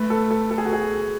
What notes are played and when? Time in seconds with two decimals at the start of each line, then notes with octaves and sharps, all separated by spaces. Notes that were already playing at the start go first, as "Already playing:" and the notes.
Already playing: A3 B4
0.10 A4
0.31 A4
0.51 A4
0.58 G#4
0.65 F#4
0.73 G#4